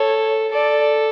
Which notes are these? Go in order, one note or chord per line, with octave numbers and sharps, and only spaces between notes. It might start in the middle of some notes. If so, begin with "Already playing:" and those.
Already playing: A4 C#5
A4 D5